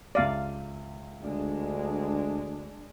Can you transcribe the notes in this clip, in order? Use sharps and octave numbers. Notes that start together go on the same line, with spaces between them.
C#2 D5 E5 F5 D#7
D2 G#3 D4